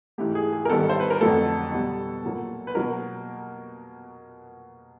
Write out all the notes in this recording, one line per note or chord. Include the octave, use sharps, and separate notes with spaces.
G#2 E3 A3 G4
G#4
G#4
A#4
G#2 D#3 G3 B3 A4
C5
B4
A#4
F2 D3 F#3 A3 A4
B2 G3 B3
A#2 F#3 A#3
B4
B2 F#3 A#3 A#4